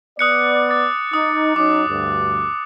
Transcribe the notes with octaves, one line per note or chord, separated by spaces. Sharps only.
B3 D5 D#6 F#6 C#7
D6 A6
D#4 D#6
F#3 C#4 D#4 D6
D2 G2